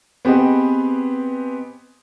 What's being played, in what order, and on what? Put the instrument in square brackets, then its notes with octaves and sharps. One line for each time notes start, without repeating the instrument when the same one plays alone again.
[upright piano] B3 C4 G4 G#4 D#5